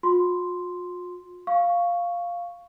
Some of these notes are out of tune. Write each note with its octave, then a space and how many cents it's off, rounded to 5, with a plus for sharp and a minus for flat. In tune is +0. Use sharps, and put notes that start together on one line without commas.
F4 +45 C6 -5
F5 +0 C#6 +0